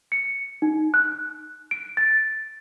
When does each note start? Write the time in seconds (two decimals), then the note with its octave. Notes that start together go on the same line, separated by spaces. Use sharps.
0.12 C#7
0.62 D#4
0.94 F#6
1.71 D7
1.97 A6